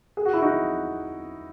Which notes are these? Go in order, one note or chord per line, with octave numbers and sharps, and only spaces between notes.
G#4
F#4
E4
D#4 F#4